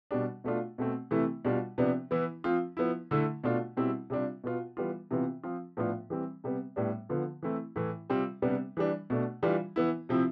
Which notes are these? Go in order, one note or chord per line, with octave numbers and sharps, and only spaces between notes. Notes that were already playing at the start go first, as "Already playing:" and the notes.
B2 G3 D4
B2 A3 D4 F4
B2 A3 C4
C3 E3 A3 E4
B2 G3 D4 F4
C3 F3 B3 D4
E3 B3 E4
F3 C4 F4
F3 B3 E4
D3 A3 E4
B2 A3 D4 F4
B2 G3 C4 E4
C3 G3 D4 F4
B2 B3 F4
E3 G3 B3 F4
C3 E3 B3 F4
F3 C4 F4
A2 F3 B3 D4 F4
E3 G3 C4
C3 G3 B3
A2 G3 B3 D4
D3 F3 B3 F4
E3 A3 C4 E4
A2 E3 A3 E4
C3 G3 C4 F4
C3 G3 B3 D4
E3 G3 D4
B2 A3 D4
E3 G3 D4 F4
E3 B3 E4
C3 F3 C4 E4